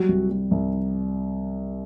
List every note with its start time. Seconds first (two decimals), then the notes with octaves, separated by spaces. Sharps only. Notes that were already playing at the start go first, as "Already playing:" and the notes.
Already playing: F#3 G3 F#4
0.09 C2
0.30 G3
0.51 C2